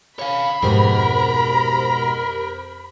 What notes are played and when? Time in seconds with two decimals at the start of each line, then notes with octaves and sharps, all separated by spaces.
0.19 C#5 F5 B5
0.63 F2 G#2 B2 G4 A#4 C5